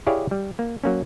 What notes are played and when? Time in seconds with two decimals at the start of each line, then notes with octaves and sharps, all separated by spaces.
0.07 E4 G4 G#4 C#5 D5 F5
0.31 G3
0.59 A#3
0.84 F#3 A#3 C#4